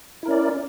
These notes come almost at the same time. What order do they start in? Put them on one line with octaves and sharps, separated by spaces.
E4 A#4 C#4 D5